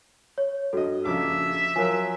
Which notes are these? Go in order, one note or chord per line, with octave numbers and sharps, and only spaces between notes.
C#5
G2 F#4 A4 D#5
A#1 C#3 E5 D6
F3 F#3 A#4 G#5